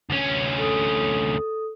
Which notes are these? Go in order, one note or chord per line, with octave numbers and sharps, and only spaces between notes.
D2 C#4
A4 D#6